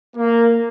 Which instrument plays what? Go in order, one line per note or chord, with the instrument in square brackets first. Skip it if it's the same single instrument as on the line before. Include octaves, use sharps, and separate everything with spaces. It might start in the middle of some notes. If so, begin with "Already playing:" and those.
[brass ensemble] A#3